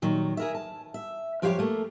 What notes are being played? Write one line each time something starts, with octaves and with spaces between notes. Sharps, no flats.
A#2 D#3 F#3
G#4 A#4 E5
A5
E5
F#2 F3 G4 C#5 F5
A3 A#3